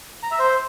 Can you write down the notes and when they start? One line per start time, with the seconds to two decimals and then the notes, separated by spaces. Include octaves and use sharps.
0.23 A#5
0.31 E5
0.39 C5